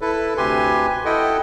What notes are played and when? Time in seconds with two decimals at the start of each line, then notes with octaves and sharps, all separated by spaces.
0.01 E4 A4 B4
0.37 D2 C3 G4 B4 G#5 C6
1.05 E4 A4 D#5 F#5 G5